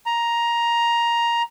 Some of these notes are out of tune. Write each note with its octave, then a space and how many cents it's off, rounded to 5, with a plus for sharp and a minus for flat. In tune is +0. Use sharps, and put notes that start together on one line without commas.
A#5 +10